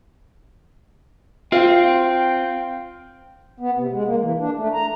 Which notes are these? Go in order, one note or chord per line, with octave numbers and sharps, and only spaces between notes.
C4 F4 G5
B3
C3
G#3
A#3
E3
D4
A3
A#5